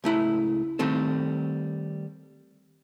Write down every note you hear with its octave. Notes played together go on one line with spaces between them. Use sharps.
C#2 A3 E4 A#5
D#3 G3 A3 C4 A4